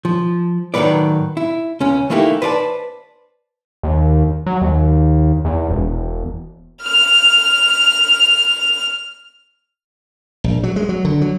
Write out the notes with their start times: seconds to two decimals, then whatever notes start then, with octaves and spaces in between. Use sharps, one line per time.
0.05 F3
0.74 A2 D#3 F3 F#3 B4 D5
1.37 E4
1.80 C#2 C#4
2.10 E3 A3 A#3 D#4 E4 G4
2.42 B4 C5 D5 F#5 A5
3.83 D#2
4.46 F#3
4.62 D#2
5.45 E2
5.70 E1
6.82 F6 F7
10.44 A#1
10.63 F#3
10.76 G#3
10.89 F#3
11.05 D3
11.21 F#3